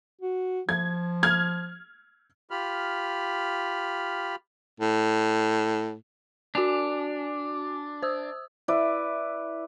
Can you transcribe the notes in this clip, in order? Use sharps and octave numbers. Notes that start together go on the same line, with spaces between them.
F#4
F3 G#6
F6 G#6
F4 G4 B5 F6
A2
D4 F#4 G#5 F7
C5 D#6 E6
E4 B4 D5